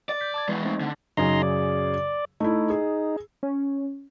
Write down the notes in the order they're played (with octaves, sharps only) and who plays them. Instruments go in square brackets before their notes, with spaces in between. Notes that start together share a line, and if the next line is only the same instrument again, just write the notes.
[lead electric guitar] D5
[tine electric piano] G6 B6
A5 D6 G#6
[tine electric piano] E3 [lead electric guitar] G#3 B3
[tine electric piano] A3 C4 D#4
[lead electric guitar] D3
[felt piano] F#2 C#3 G#4 [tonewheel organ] D#4 A#5 C6
[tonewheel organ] D5
[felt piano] A3 E4 [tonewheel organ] D#4
[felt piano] G#4
[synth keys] C#4